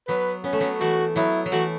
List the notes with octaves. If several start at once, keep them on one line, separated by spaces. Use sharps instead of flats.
F#3 B3 B4
B3 C#4
A3
F#3 B3
E3 A3 F#4
F#3 B3 E4
F#3
E3 A3 F#4